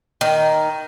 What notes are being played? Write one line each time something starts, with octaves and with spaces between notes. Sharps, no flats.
D#3